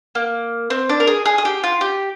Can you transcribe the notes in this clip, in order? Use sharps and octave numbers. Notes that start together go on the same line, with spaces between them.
A#3
C4
D4
A#4
G#4
G#4
G#4
G4
F4
G4